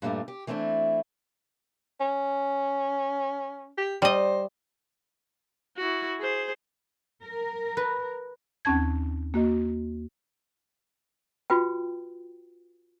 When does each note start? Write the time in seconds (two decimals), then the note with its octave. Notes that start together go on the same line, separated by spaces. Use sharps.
0.02 G2 A#2 G3 A3 D#4
0.28 G4
0.47 E3 A3 C4 D4 E4
2.00 C#4
3.78 G4
4.02 G3 C5 D#5
5.77 E4 F#4
6.19 G#4 C5
7.25 A#4
7.77 B4
8.65 D#2 C4 C#4 A5 G#6
9.34 A#3 F#4 D#5
11.50 F4 F#4 B4 G5